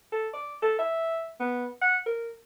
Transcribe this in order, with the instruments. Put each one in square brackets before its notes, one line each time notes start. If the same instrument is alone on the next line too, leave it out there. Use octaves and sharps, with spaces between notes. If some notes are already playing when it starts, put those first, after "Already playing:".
[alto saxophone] A4
D5
A4
E5
B3
F#5
A#4